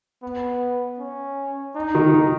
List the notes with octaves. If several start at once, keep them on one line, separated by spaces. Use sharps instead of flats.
B3
C#4
D#4
D#3
D#3